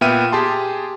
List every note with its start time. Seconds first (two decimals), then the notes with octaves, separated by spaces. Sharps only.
0.01 A#2 B3 E5 G5 F6 D#7
0.32 G4 G#4 A5 C6